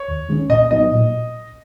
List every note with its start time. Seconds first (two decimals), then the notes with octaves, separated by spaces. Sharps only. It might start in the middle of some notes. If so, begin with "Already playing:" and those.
Already playing: C#5
0.08 D#2
0.29 D#3 G#3 C#4
0.49 A#2 D#5
0.71 F#3 B3 D#4 D#5
0.92 A#2